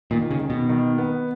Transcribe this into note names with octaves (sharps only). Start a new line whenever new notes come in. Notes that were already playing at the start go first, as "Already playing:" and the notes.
A#2 D#3
C#3
D#3
B2
D#3
B3